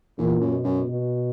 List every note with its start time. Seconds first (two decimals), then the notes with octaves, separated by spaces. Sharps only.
0.18 E2 A#2
0.40 F#2
0.52 B2
0.64 F#2
0.87 B2